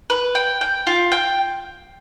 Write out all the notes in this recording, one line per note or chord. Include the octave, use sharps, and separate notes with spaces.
B4
G5
G5
F4
G5